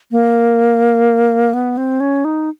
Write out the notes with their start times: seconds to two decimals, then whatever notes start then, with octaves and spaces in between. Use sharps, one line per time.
0.11 A#3
1.54 B3
1.77 C4
2.00 C#4
2.25 D#4